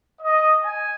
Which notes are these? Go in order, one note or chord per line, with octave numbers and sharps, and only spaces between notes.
D#5
G#5